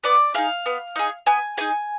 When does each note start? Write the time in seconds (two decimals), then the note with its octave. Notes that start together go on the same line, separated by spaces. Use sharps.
0.04 B3 D5
0.34 D#4 G#4 F5
0.66 B3
0.96 D#4 G#4
1.26 B3 G#5
1.57 D#4 G#4 G#5